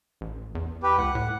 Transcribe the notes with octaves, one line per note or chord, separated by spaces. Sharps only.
A1
E2
G4 B4
C#2 F#5
A2